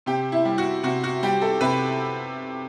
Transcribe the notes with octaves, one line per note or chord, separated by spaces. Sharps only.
C3 G4
E4
G3
F#4
C3 F#4
F#4
G3 G4
A4
C3 B4